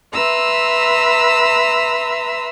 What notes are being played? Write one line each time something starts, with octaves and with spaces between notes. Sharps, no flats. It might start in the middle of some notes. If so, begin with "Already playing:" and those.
B4 E5 A#5 C6 E6